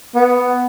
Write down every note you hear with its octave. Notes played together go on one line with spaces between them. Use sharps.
B3